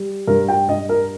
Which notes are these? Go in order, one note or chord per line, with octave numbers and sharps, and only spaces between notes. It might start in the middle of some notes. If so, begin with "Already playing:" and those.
Already playing: G3
G2 A#4
G5
G2 D#5
A#4